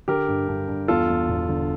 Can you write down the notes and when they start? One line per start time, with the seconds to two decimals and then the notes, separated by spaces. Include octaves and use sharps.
0.08 D3 G4 A#4
0.28 G2
0.48 G2
0.68 G2
0.88 E2 F4 A4
1.08 E2
1.29 E1
1.49 D3